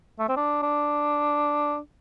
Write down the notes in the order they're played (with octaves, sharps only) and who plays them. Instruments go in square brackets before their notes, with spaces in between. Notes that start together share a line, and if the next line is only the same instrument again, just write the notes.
[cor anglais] A3
C4
D4
D4